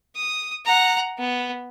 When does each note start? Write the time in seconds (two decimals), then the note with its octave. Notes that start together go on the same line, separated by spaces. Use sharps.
0.16 D#6
0.65 F#5 A#5
1.18 B3